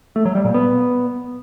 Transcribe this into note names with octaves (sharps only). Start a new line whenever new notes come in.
A3
F#3
G3
A#2
B3